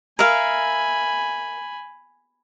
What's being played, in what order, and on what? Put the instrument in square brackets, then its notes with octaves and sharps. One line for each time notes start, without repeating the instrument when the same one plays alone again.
[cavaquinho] A#4 E5 F5 [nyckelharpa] G#5 B5